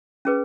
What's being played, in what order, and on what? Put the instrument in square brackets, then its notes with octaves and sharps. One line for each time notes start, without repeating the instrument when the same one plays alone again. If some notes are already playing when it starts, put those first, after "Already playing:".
[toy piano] C#4 G#4 B4